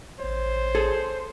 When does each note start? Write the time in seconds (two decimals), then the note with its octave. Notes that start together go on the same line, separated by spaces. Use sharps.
0.20 A1 C5 C#5
0.75 G#4 A4